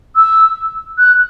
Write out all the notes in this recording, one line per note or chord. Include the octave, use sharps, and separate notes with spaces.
E6
F#6